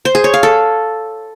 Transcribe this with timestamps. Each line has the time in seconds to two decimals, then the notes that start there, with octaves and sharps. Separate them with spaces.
0.05 C5
0.15 G#4
0.24 C#5
0.34 F5
0.43 A4